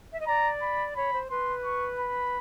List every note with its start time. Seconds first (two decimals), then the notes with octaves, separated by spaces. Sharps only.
0.12 E5
0.19 D#5
0.27 D5 A#5
0.62 B5
0.96 C#5 B5
1.13 C5
1.30 B4 C6
1.65 C#6
1.99 B5